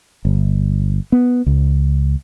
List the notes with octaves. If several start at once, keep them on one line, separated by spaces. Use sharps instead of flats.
G1
B3
C#2